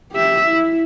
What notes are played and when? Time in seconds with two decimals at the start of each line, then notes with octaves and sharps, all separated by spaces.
0.13 G4 E5
0.47 E4